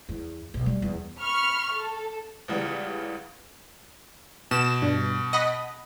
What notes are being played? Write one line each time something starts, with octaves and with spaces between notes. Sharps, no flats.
E2
B1
G3
E2
B5 C#6 F6
A4
C#2 C#3 E3 G3 B3
B2 E7
G2
D#5 F#5 B5